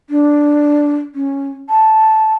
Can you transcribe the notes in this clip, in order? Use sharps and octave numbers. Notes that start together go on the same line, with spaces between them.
D4
C#4
A5